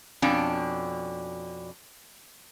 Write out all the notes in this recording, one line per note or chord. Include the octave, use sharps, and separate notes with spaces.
F2 B2 C#4 D4